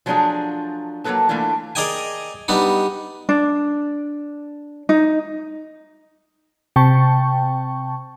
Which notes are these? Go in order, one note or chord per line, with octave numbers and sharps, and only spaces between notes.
F3 F#3 A3 D4 F4 G#4
F#3 A#3 F4 A4 B4 A5
E3 A3 A#3 D4 F4
G#4 A#4 D5 D#5 G5 G#5
G3 B3 D4 D#4
D4
D#4
C3 G5 A5 C#6